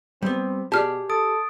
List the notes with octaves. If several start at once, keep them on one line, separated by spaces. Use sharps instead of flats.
G3 B3 C4
B2 G4 G#4 D5 A5 F6
A4 D#6 A6 D7